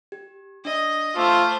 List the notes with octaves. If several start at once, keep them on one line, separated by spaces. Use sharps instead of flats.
G4
D4 D#5
A3 F4 C5 A5 D6 E6